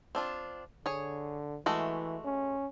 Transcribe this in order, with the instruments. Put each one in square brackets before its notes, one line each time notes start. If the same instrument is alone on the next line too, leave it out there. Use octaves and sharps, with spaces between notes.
[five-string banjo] C4 D4 F4
[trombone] D3 [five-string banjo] G#4 C#5
[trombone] E3 [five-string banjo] G#3 A3 F#4
[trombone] C#4